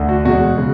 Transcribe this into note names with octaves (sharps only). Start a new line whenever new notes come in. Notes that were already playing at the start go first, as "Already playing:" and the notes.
Already playing: D2
F#4
E2 B2 G#3 F#4
C#3